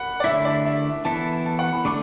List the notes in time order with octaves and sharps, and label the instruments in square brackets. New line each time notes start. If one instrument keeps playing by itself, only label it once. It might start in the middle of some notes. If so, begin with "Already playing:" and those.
Already playing: [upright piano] F#5 B5
D5
[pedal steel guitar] D3 A3 E4 [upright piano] E5
[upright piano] D5
E5
[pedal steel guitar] E3 B3 E4 A4 [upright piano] A5
[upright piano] A5
F#5
B5
[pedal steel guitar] D3 A3 D4 [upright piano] D6